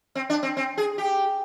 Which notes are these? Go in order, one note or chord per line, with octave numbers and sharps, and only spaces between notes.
C4
D4
C4
C4
G#4
G4